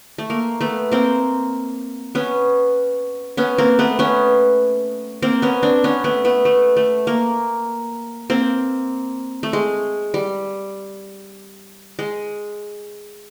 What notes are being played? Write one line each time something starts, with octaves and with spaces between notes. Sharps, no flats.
A3
A#3
A3 B3
A#3 C4
B3 C#4
B3 C#4
A#3 C4
A3 B3
B3 C#4
A#3 C4
B3 C#4
C4 D4
B3 C#4
A3 B3
A3 B3
A3
A3
A#3
A#3 C4
A3
G#3
G3
G#3